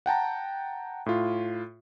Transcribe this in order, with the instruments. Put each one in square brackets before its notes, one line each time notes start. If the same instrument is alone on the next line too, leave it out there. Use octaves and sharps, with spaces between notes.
[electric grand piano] F#5 G5 A5 A#5
A2 F4